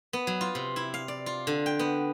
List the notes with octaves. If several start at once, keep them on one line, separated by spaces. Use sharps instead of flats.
B3
F#3
F4
C3
E4
F5
D5
F4
D3
G5
B3